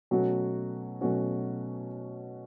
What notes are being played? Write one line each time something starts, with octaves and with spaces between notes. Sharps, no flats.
B2 F#3 A3 C#4 F#4
B2 F#3 A3 C#4 F#4